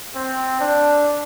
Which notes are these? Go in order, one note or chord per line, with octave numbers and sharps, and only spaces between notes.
C4
D4